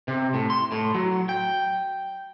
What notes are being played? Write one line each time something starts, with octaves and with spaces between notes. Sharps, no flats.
C3
A2
C6
A2
F#3
G5